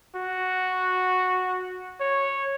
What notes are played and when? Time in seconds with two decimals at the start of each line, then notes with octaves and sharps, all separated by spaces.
0.15 F#4
2.00 C#5